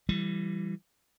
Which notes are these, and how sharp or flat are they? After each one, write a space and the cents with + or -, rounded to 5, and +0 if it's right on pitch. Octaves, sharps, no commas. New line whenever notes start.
E3 +20 G3 +0